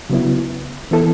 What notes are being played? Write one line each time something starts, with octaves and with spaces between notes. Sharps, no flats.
C#3 F#3 B3 E4
E3 B3 E4 A4